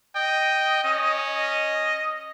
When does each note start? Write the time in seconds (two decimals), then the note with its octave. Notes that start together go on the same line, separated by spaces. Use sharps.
0.16 D#5 G5
0.84 C#4
1.36 D#5